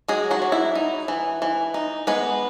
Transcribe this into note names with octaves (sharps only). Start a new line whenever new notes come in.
F#3 G#3 G#4
F#3 F#4
F#3
E4
D#4
E3
E3
D#4
G#3 B3 B4